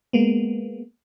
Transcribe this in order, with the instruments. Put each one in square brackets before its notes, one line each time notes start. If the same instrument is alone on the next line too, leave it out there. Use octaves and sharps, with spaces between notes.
[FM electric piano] G#3 A#3 B3